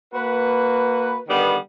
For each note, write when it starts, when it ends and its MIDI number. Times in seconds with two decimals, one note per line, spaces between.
0.14 1.20 58
0.14 1.20 66
0.14 1.20 71
1.28 1.57 50
1.28 1.57 51
1.28 1.57 55
1.28 1.57 59